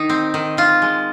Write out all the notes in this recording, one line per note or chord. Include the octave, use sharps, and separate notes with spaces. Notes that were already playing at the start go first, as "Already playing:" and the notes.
Already playing: D#3 D#4
C4
D#3
D#3 F4
G#3